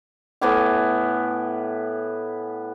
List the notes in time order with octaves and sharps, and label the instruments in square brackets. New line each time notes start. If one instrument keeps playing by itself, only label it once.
[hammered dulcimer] A2 B3 G#5 D6